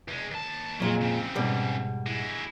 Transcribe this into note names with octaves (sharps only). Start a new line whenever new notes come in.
E2 G#3
D#2 A5
F2 A#2 F#3 G#3
C#3 C4
G#2 B2 G3
G#3 E4